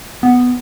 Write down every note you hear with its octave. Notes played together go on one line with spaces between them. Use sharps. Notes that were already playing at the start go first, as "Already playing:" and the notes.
B3